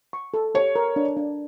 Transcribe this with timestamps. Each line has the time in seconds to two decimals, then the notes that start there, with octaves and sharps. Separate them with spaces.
0.13 C#6
0.34 A4
0.55 G4 C#5
0.76 A#4
0.96 D4
1.17 D4